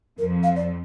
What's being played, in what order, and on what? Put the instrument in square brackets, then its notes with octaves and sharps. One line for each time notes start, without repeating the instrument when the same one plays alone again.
[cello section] F2 F3 [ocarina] A#4
[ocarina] F5
D5